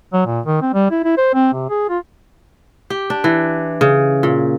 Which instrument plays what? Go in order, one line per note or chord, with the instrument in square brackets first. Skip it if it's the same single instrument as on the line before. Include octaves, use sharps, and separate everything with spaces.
[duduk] F#3
A#2
D#3
C4
G3
E4
E4
C5
C4
C3
G#4
F4
[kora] G4
D4
E3
C#3
A#2